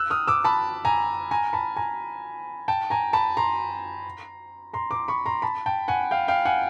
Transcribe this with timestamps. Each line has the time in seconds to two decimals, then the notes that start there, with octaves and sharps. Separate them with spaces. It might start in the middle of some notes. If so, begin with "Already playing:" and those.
Already playing: E6 F#6
0.10 D#6 F6
0.28 D6 E6
0.44 A5 B5
0.85 G#5 A#5
1.31 G#5 A#5
1.53 A5 B5
1.76 G#5 A#5
2.68 G5 A5
2.90 G#5 A#5
3.13 A5 B5
3.37 A#5 C6
4.73 A#5 C6
4.91 C6 D6
5.08 B5 C#6
5.26 A#5 C6
5.42 A5 B5
5.66 G5 A5
5.88 F#5 G#5
6.11 F5 G5
6.28 F5 G5
6.45 F#5 G#5